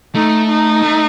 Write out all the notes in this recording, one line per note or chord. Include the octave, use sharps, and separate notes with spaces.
A3 D#4
D#4
A3